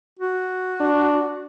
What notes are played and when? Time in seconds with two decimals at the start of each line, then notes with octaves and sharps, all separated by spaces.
0.19 F#4
0.80 D4